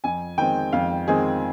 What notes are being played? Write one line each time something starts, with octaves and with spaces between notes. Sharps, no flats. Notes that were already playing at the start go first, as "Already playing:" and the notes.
F2 G#5
D#3 G#3 C4 G5
F2 F5
D#3 G#3 C4 G#4